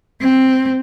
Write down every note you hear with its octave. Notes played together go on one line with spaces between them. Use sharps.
C4